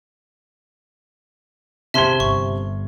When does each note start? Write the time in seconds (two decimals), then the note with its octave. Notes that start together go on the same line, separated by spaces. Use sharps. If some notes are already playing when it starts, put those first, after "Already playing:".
1.94 C3 E5 A5 C6 G#6 G7
2.20 G1 C#6